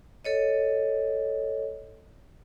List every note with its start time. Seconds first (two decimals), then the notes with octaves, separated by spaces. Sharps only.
0.25 A4 C#5 D#5